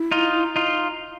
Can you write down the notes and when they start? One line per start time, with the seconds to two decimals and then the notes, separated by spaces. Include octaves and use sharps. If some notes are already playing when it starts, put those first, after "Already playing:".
Already playing: E4
0.12 D#4 F4
0.56 D#4 F4